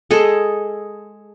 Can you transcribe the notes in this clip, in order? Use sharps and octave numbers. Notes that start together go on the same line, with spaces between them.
G#3 G#4 A4